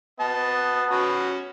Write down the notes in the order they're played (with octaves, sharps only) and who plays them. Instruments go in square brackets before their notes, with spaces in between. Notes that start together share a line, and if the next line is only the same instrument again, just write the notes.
[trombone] B3 [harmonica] D#5 A5
[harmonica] C#4 F#4 B5